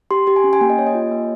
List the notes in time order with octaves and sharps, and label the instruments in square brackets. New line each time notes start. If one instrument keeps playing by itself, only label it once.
[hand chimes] G4 C6
G4 C6
G#5
C#4
G#5
A#3 G5
D#5
A#3 C#5
D#5
F4
A#3